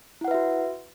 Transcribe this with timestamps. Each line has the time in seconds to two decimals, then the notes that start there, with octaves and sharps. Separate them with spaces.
0.21 E4
0.24 F#5
0.28 B4
0.31 E5
0.34 F#4